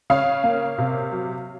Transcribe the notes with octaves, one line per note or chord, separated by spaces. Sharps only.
C#3 C#5 F5
A#3
C3
F#3